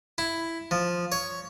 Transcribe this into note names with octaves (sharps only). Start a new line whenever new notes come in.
E4
F3
C#5